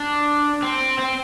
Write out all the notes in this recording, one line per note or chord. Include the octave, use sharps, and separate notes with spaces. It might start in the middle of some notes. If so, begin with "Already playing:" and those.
Already playing: D4
C4
C4